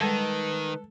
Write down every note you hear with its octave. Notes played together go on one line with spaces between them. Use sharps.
D#3 G3 G#3 A4 B4